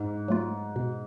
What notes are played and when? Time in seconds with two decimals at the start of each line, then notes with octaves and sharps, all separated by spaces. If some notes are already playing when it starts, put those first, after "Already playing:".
Already playing: G#2
0.28 F#3 A3 F4
0.76 B2